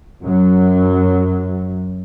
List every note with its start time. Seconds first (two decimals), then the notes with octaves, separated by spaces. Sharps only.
0.22 F#2 F#3